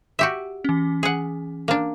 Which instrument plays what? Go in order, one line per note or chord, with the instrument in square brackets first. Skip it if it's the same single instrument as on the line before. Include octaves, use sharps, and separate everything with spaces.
[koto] F#4 G4 E5
[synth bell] E3 C#4
[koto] G#4 F#5
A#3 D4